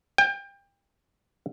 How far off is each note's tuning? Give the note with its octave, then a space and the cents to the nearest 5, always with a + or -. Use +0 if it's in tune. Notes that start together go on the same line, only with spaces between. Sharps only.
G5 +30